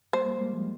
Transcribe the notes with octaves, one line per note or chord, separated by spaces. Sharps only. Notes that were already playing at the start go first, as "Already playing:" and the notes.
G3 A#3 C5
G3 A#3
G#3
G3 A#3
F3 G#3